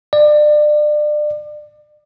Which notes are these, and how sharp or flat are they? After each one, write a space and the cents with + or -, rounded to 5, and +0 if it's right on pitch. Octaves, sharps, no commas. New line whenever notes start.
D5 +30